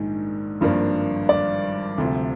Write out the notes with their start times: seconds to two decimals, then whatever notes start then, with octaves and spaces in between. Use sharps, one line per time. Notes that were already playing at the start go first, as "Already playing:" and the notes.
Already playing: A#1 G#2 D#3 D4
0.61 G#1 G2 F3 A#3 D4
1.29 D5
1.98 D2 C3 F3